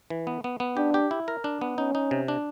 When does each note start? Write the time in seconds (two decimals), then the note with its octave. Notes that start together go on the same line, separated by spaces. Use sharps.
0.10 E3
0.27 B3
0.44 B3
0.60 B3
0.77 D4 G4
0.94 G4
1.11 E4
1.28 A#4
1.44 D4
1.61 B3
1.78 C#4 D#4
1.95 D#4
2.11 C3
2.28 D4